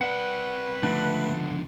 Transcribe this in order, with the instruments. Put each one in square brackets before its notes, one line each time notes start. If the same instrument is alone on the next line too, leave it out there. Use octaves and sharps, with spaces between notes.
[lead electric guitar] C4 D5 [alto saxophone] B4 [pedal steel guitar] F#5
[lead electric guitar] C#2 F3 [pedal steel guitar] D3 D4 F#5 [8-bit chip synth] A3